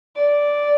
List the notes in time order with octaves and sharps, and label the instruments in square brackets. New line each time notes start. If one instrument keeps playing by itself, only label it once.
[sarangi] D5